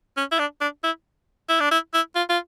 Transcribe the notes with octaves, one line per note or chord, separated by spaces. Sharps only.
C#4
E4
D4
D4
E4
E4
D4
E4
E4
F4
F4